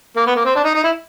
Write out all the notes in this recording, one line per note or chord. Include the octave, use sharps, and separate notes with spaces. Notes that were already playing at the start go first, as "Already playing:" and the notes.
A#3
B3
A#3
C4
D4
D#4
D#4
E4